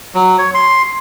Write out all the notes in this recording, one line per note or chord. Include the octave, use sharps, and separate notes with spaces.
F#3
C#5
C6